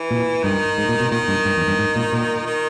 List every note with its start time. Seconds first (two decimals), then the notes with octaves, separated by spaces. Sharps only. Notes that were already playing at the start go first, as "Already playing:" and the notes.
Already playing: E3
0.11 A#2
0.43 G2 D#3
0.78 G#2
0.89 A#2
1.00 B2
1.11 A#2 D#3
1.28 G2
1.45 G2
1.57 E2
1.67 G2
1.79 G#2
1.96 A#2
2.12 A#2
2.46 D#3